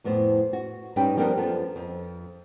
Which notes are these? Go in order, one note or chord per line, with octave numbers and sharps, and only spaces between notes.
F2 A2 B3 C5
F#4
G2 G3 C#4 D#4 B4 G5
F3 G3 B3 D4 A#4 C5
F#2 F3 B3 A4
F2